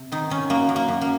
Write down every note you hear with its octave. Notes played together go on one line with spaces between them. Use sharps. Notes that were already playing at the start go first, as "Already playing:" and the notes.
Already playing: C3
D#3 D#4
D#3 C#4
F#2 A#3
F#2
A#3
F#2
A#3